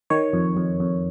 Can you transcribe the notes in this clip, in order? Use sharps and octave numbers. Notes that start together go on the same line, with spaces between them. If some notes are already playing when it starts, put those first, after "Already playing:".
D#3 C#5
F2
F2
F2